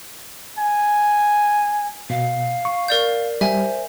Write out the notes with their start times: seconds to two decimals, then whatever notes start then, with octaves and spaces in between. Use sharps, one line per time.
0.58 G#5
2.10 B2 F5
2.65 C#6
2.88 A#4 D5 G6
3.41 G3 C5 E5 G#5